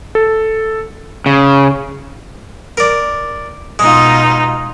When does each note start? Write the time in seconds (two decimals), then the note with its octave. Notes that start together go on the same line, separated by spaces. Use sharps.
0.15 A4
1.26 C#3
2.77 A#4 D5
3.79 B2 G#3 D#4 F4